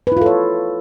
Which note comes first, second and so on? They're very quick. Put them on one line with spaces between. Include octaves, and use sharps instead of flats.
B4 E4 F4 A4 C#5